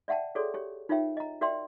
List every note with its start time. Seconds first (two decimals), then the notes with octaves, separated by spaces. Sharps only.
0.08 D5 E5 F#5 G5 A5
0.35 F#4 G#4 A4 C#5 D5
0.54 G4 C#5
0.89 D#4 F4 A#4 C#5 E5 G5
1.17 D#5 A#5
1.41 F#4 A#4 D5 E5 G5 C6